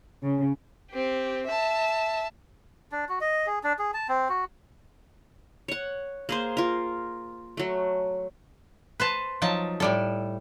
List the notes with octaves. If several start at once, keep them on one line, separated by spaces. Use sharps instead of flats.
C#3
C4 G4
E5 A5
D4
F#4
D#5
G#4
D4
G#4
A5
C4
F#4
C#5 F#5
A#3 G#4 C5
F4 A#4
F#3 A3
B4 C5 A5
F3 F#3 D#4 A5
A2 G3 A4